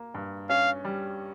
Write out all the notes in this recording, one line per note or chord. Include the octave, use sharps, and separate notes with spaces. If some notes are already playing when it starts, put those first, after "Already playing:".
Already playing: A#3
G2
C#4 F5
G3